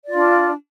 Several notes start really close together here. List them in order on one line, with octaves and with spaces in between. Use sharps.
D5 F4 D4